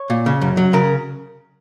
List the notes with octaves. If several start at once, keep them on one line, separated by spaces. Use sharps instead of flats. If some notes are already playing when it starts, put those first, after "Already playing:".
Already playing: C#5
A#2
C#3
F#2
F#3
C#3 A#4